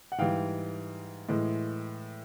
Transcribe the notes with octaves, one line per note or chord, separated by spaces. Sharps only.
F#5
G#2 E3 G3 F5 G5
A2 E3 G#3